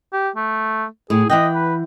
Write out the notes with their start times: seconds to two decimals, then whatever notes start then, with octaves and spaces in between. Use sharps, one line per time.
0.13 G4
0.36 A3
1.10 A2 G#4
1.30 E3 D#5 F#5 G5
1.55 B4